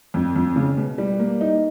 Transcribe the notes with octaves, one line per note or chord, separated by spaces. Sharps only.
F2
F2
C#3
B2
G3
A#3
D#4